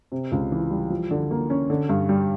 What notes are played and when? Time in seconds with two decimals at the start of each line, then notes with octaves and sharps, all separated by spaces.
0.12 C3
0.32 C#2
0.52 E3
0.71 G3
0.90 F3
1.11 D3
1.31 A#3
1.50 C#4
1.70 D3
1.89 G2
2.09 G3